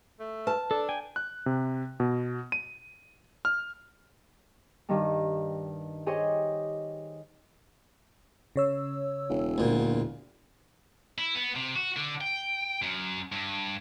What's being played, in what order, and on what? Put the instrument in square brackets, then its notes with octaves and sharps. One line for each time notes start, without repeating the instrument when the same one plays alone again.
[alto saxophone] A3
[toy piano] B4 [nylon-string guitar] A5
[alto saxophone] D4 [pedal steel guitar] A4
[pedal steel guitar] G5 G#5
[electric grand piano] F#6
C3
B2
D#7
F6
[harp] G2 D#3 G3
G4 G#4 C5 C#5 D#5
[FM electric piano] C#3 C#5 E6
[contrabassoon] E1
[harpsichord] D2 A#2
[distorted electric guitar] E4
B3
C3
F#4
D3
G5
F#2
G2